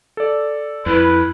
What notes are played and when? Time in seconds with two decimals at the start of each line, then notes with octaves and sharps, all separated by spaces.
0.17 A4 D5
0.86 F2 E4 B4